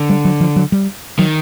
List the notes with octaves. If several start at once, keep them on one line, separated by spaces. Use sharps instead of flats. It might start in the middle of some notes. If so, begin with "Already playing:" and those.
Already playing: D3
G3
F#3
F3
F#3
G3
D#3 F#3